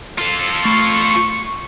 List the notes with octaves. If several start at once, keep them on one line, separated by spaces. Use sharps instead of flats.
F4 A4
A3 B5 C#6 C7